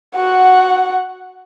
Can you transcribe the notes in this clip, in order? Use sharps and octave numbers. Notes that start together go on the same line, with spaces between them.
F#4 F#5